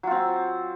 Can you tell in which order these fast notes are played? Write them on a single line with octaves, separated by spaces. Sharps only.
F#3 F4 C4